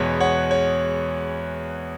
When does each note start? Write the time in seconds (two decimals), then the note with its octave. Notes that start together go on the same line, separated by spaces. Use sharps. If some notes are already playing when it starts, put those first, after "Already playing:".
Already playing: E2 B2 G#3 B3 C#5
0.20 C#5 F#5
0.51 C#5